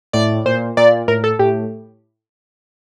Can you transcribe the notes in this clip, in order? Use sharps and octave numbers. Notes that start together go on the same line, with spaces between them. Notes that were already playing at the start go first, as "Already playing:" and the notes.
A2 D5
A#2 C5
A#2 D5
A2 A#4
A4
A2 G4